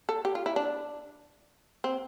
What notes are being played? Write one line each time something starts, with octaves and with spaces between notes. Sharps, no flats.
A4
G4
F4
E4
D4
C4